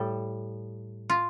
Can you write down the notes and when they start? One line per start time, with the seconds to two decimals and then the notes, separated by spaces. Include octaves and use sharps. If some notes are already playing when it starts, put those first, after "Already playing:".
Already playing: A2 G3 A4
1.10 F4